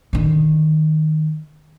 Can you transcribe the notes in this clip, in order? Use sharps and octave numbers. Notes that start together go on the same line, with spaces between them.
D3 D#3